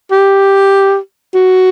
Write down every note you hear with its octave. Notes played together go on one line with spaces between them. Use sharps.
G4
F#4